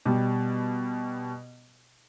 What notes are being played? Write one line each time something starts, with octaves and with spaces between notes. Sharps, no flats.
B2 G3